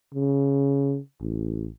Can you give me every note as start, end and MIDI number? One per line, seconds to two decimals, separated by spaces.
0.14 0.98 49
1.21 1.68 33